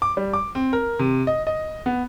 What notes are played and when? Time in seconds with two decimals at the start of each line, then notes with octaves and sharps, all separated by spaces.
0.02 D6
0.17 G3
0.33 D6
0.55 C4
0.73 A#4
0.99 C3
1.27 D#5
1.47 D#5
1.86 B3